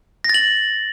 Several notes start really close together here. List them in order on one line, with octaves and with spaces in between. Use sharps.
A#6 A6 F#7